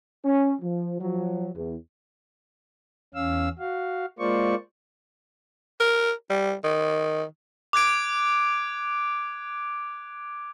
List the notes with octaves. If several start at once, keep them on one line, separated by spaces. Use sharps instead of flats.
C#4
F3
F3 F#3
E2
E2 C#4 F5 E6
F#4 F5
G#3 A#3 F4 C5 D5 C#6
A#4
G3
D#3
D6 F#6 G#6 D7